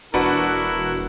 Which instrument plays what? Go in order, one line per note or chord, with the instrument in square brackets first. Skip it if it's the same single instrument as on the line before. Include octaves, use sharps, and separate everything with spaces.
[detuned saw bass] E1 [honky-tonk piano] D4 F#4 B4 [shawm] E4 [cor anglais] A#4